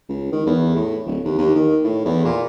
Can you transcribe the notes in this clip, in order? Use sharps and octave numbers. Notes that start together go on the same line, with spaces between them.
C#2
D#3
E2
A2
D1
D#2
D#2
D#3
A2
E2
A#2